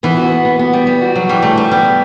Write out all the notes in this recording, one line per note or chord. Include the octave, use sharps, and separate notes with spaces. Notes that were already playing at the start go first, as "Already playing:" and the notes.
E3 B3
F#4
B3
B3
B3
G3
G3
F#4
C#3 F#3
E3 G3
C#3 A3
C#3 G3
G3 B3
E3